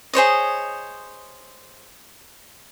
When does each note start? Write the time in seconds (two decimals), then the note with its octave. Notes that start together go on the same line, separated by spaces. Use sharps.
0.13 G#4 C5 C#5 D#5